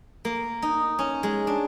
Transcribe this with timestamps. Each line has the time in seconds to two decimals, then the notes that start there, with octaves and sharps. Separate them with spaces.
0.25 A#3
0.62 D#4
0.99 C#4
1.23 G#3
1.47 D4